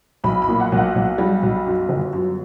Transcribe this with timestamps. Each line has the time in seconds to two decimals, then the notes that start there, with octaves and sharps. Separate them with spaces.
0.24 B1 B5
0.42 B5
0.48 A#2
0.60 F#5
0.72 B1
0.77 F#5
0.95 B1
1.18 G3
1.43 B1
1.66 F#2
1.89 G1
2.13 F#2